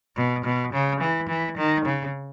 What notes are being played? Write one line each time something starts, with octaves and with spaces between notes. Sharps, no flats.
B2
B2
C#3
E3
E3
D#3
C#3